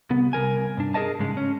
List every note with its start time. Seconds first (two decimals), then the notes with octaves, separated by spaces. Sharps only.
0.10 C2 B3
0.33 C2 F3 A#4 G#5
0.77 G2 D4
0.94 G#4 A#4 C#5 D#5 A5
1.19 G#2 C#3 G#3
1.37 C#4